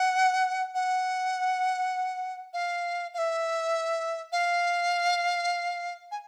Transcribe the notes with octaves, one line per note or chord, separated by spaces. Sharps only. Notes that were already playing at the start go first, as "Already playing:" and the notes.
Already playing: F#5
F#5
F5
F5
E5
F5
G#5